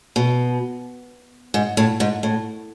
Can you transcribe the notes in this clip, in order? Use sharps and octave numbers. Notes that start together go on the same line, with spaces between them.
B2
G#2
A2
G#2
A2